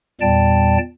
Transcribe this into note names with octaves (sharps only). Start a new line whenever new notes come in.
E2 A#2 G3 D5 G5 A5